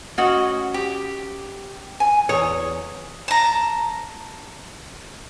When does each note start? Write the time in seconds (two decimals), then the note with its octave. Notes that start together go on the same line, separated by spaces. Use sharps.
0.18 C#4 F#4 D#5
0.74 G4
2.00 G#5
2.29 E2 C#5 D#6
3.28 A5 A#5